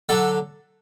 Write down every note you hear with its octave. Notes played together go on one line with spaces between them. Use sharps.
D3 F#3 A4